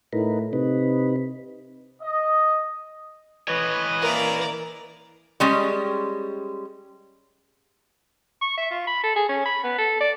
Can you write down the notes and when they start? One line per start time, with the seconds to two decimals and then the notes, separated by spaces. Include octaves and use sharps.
0.13 A2 D#4 A#4 B4
0.53 C3 D#4 B4
2.02 D#5
3.48 E3 B4 C#5 D#5
4.01 A#3 E4 A#4 D5
5.40 G3 G#3 C#4
8.41 C#6
8.57 E5
8.71 F4
8.87 B5
9.03 A4
9.16 G#4
9.29 C#4
9.46 B5
9.64 B3
9.78 A4
10.00 D5